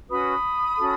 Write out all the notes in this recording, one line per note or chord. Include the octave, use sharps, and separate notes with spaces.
C#4 F#4 B4 B5 D#6
C#4 F#4 A4